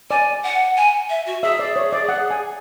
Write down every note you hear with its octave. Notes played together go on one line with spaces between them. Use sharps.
D5 G#5
F#5
G#5
E5
F#4
G#4 E5
D5
C#5
D5
F#5
G#5